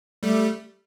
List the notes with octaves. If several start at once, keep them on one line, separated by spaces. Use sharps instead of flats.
G3 A3